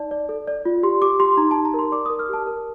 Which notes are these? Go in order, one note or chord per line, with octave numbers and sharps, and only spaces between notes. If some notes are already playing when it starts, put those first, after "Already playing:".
Already playing: D#4 D5 A5
D5
A4
D5
F4
G4 C6
G4 D6
G4 C6
D#4 A#5
A5
D#4
A#5
A#4 C6
D5 D6
A#4 D#6
F6
G4 A5
A#4